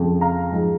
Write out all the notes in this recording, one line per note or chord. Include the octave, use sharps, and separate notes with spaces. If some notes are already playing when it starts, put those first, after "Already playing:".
Already playing: F2 C#3 F3 G#3
F5 A#5
G#2 F3 G#3